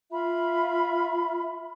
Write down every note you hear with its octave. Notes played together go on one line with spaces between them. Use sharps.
F4 E5 B5